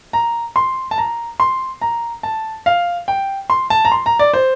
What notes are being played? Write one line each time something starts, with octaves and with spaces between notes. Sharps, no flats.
A#5
C6
A5
A#5
C6
A#5
A5
F5
G5
C6
A5
A#5
C6
A#5
D5
C5